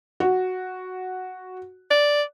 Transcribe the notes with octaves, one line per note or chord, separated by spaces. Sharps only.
F#4
D5